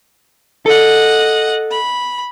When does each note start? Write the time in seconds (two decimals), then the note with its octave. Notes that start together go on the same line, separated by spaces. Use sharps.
0.66 A4 D#5 F#5
1.72 B5